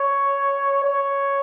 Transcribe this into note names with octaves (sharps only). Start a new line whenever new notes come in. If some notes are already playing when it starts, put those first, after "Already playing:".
Already playing: C#5
C#5